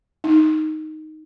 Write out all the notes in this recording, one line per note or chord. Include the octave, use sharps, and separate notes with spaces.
D#4